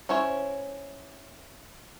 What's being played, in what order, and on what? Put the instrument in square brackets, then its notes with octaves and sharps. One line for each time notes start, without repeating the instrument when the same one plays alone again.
[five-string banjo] C#4 E4 C5 C#5